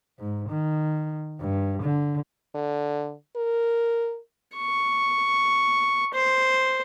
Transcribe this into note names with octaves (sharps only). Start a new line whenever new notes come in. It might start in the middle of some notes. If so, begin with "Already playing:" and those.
G#2
D#3
G2
D3
D3
A#4
C#6
C5